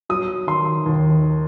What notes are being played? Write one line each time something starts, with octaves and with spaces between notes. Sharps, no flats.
F#3 D#6
D#3 C6
D#2